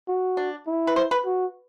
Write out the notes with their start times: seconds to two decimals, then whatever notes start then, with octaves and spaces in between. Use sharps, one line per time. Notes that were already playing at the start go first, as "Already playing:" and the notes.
0.08 F#4
0.37 D4
0.67 E4
0.87 B4
0.96 C5
1.11 B4
1.25 F#4